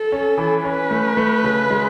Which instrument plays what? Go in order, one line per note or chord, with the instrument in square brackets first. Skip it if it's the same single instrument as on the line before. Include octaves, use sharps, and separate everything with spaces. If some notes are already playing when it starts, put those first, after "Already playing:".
Already playing: [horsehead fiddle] A4
[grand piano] C#4
E3
[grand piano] C#4 [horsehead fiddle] B4
[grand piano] A3
A3
C#3
G#3